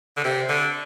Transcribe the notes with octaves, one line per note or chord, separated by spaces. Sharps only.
D3
C3
D3